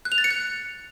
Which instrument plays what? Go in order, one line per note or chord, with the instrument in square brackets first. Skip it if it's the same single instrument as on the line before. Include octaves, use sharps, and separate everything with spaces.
[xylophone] F#6
F7
A6
C#7
F#6